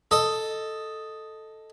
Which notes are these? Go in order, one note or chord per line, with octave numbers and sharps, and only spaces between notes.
A4 D#5